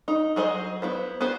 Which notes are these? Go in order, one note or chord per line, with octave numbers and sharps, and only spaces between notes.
D#4
F#3 G#4 C5 D#5
B3 E4 C5
B3 F#4 B4 C5